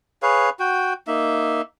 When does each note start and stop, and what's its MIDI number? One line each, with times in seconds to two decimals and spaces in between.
0.22 0.50 68
0.22 0.50 71
0.22 0.50 73
0.22 0.50 77
0.59 0.93 66
0.59 0.93 79
1.07 1.62 58
1.07 1.62 63
1.07 1.62 76